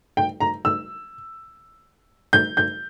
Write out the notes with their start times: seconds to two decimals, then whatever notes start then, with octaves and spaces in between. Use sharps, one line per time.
0.17 G5
0.40 A#5
0.65 E6
2.33 G6
2.57 G6